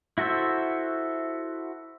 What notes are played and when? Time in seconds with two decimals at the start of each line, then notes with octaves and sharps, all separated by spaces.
0.18 E4 F#4 A4 C5 E5